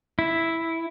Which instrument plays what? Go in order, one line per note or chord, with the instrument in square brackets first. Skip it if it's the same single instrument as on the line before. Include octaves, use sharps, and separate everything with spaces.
[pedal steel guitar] E4